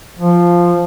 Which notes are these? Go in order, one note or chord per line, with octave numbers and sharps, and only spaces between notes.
F3